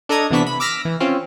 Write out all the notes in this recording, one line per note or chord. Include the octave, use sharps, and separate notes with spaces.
D4 A4 D#5 A#5 D#6 G#6
C3 E3 B3 D4 C#6 B6
B5
D6 E6 F6 A#6 B6 D7
E3
C4 C#4 F4